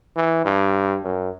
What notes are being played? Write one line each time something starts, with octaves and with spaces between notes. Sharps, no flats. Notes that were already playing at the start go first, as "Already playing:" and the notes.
E3
G2
F#2